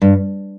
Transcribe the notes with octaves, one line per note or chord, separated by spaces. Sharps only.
G2